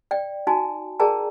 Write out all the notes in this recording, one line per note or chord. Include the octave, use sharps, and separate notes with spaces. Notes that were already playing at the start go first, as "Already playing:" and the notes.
D5 G5
D#4 F#4 G#5 A5
G#4 A#4 D5 G5 A5 A#5